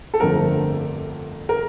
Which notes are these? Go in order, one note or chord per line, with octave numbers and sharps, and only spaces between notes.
A4
G1 F2 D3 F3 A3 A#4
A#4